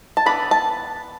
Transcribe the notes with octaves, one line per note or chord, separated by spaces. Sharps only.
A5
E3 B3 D4 B5
A5